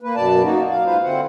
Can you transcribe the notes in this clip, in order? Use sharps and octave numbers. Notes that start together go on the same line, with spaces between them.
A#3 B4
F#2 B2 D5 A5
A#3 D#4 F#4
F5
G#2 G#3 F4 B4 C5 F5
D3 C4 E4 C5 F#5